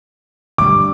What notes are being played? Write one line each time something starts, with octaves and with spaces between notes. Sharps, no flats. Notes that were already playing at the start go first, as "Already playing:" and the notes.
D3 G3 D6